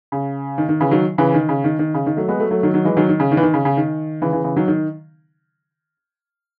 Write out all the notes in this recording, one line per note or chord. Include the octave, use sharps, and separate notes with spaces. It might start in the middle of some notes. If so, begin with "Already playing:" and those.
C#3
D#3
D#3
C#3 E3
D#3 F#3
C#3 E3
D#3
C#3
D#3
D#3
C#3
D#3
F#3 A3
G#3 B3
F#3 A3
F#3 A3
D#3 F#3
D#3 F#3
E3 G#3
D#3 F#3
D#3
C#3
D#3
E3
D#3
C#3
C#3
D#3
C#3 E3
C#3 E3
C#3 E3
D#3 F#3
D#3